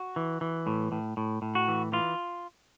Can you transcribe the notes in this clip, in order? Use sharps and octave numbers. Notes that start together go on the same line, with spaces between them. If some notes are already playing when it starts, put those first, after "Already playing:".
Already playing: F#4
E3
E3
A2
A2
A2
A2
F#4
E3
E3 F4